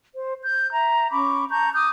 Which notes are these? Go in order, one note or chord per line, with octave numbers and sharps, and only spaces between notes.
C5
G6
E5 A#5
C#4 B5 C#6 D6
A5 A#5 C#6 G6
D6 D#6 F6 G6